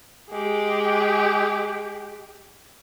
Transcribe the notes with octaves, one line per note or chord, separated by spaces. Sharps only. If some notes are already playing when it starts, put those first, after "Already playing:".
G#3 G4